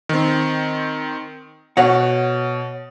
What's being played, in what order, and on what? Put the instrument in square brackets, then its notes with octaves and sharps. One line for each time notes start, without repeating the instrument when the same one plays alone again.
[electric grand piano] D#3 C4
[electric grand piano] B2 [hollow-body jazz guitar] C#5 F#5